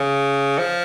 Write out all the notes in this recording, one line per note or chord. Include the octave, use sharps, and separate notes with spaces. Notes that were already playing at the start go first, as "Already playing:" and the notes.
Already playing: C#3
F3